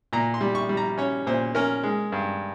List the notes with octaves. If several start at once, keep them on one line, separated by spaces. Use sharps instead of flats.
A#2 A#5
C6
G3
C#6
G3
A#5
C#4 C#5
A#2 C5
C#4 A#4
G#3
G2